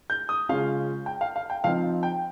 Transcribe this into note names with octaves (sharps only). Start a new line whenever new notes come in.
G6
D#6
C#3 G#3 C#4 F4 F5
G5
F5
F5
G5
F3 C4 D#4 F5
G5